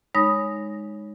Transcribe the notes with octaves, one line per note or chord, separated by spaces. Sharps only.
G#3 D#4 C#5 B5 D#6 A#6